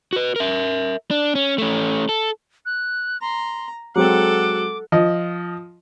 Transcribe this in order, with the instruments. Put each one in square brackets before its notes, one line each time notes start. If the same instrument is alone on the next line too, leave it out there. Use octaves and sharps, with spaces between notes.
[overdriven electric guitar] F#4 B4
A#4 E5
D4
C#4
A3 C#4
A4
[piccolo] F#6
[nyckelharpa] A#5 [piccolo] C6
[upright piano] F#3 G#3 C4 [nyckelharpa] A4 F#5 [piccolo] D6
[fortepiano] F3 D#5